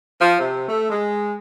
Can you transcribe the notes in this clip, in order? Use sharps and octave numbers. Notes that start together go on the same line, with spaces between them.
F3
C3
A3
G#3